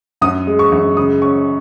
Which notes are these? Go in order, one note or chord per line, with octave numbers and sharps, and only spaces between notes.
F#2 D#6
G#3
C#6
F#2
C#3 D#6
C#4 C#6